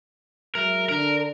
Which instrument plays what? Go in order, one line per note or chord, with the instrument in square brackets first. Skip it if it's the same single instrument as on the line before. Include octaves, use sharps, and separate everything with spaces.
[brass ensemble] F#3 G#3 E5 [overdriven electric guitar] A#4
[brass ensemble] D3 D4 [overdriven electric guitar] A#4